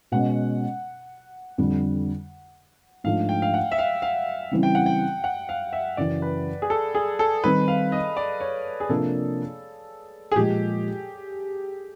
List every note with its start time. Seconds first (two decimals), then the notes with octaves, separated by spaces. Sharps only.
0.12 B2 G#3 C#4 F#5
1.58 F2 D3 G3
3.04 G#2 F3 A3 D4 F5
3.29 G5
3.42 F5
3.54 F#5
3.72 E5
3.78 F5
4.02 F5
4.51 C#3 E3 G3 C4 E4
4.63 G5
4.75 F#5
4.86 G5
5.24 F#5
5.49 F5
5.73 E5
5.97 F#2 C#3 E3 D5
6.22 B4
6.62 G#4
6.70 A4
6.95 G#4
7.19 A4
7.44 D#3 G3 C4 D#4 B4
7.68 F5
7.92 D#5
8.17 D5
8.40 C#5
8.80 G#4
8.89 C3 F3 A#3 D4 A4
10.32 G#4
10.36 A#2 F3 G#3 G4